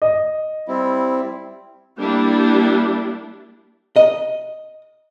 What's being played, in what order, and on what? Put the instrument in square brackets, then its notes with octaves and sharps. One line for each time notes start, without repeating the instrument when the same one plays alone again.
[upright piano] D#5
[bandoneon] G3 C4 E4
[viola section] G3 A#3 D4 E4
[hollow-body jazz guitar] D#5